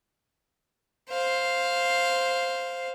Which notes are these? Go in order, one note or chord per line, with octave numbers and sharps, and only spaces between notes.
C5 F5